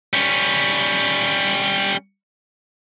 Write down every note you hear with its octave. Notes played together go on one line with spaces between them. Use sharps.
G3 C#4